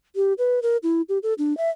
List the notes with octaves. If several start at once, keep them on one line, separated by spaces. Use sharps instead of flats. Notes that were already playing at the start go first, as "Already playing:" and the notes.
G4
B4
A#4
E4
G4
A4
D4
E5